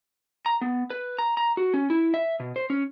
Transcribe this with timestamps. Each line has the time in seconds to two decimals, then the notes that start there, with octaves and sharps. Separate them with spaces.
0.46 A#5
0.61 B3
0.90 B4
1.19 A#5
1.37 A#5
1.57 F#4
1.74 C#4
1.90 E4
2.14 E5
2.40 B2
2.56 C5
2.70 C#4